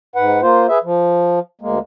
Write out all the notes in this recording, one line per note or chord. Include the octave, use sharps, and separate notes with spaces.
G#2 B4 F#5
A#3 F4 C5
G#4 B4 E5
F3
D2 G#3 A#3